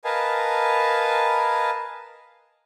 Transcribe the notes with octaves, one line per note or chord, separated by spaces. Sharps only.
A#4 B4 D#5 F5 G#5 A5